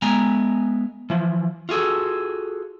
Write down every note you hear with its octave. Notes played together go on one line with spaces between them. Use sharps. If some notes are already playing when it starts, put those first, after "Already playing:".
G#3 B3 G#5 A#5
E3 F3
F4 F#4 G#4 A4